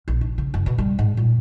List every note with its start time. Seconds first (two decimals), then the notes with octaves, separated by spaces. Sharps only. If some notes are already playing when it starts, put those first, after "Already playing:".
0.08 A#1
0.21 D4
0.38 C#3
0.54 F#1
0.66 B2
0.78 G3
0.99 G#2
1.17 A#2